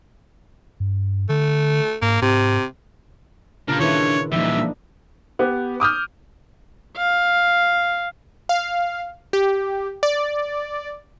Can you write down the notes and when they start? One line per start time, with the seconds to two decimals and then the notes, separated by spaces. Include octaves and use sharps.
0.80 G2
1.29 D3 A3
2.02 G#2 A#3
2.22 G#2 C3
3.68 A#2 C#3 D4 F4 A#4 B5
3.80 D#3 E4 B4 C#5
4.32 A#2 E3 F3 G3 D#4 E5
4.57 D4
5.39 B3 G4
5.80 D6 D#6 F6 G6
6.97 F5
8.49 F5
9.33 G4
10.03 D5